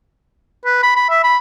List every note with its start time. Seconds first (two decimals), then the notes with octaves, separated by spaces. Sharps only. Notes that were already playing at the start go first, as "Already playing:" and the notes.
0.65 B4
0.83 B5
0.96 B5
1.10 E5
1.24 B5